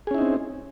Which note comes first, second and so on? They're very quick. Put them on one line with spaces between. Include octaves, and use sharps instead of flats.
G#4 C#4 E4 D#4 C4